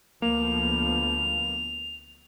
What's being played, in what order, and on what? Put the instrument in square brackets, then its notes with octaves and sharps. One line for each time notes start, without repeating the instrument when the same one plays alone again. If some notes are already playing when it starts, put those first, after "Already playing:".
[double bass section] D2 F3 B3 [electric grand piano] A#3 [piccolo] F7